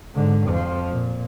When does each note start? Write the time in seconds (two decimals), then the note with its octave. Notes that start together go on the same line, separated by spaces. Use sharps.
0.14 G#2 D3
0.47 F2 F3
0.91 A#2